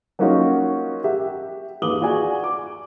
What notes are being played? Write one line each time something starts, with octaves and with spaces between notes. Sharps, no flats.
F#3 A#3 C#4 D#4 F4 F#4
G4 E5 F#5
D#2 B4 D6 D#6 F#7 G7
F4 F#4 G#4 D5 G#5
D6